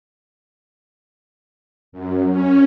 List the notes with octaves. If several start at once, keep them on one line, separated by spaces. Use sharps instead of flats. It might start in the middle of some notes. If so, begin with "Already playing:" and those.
F#2
C#4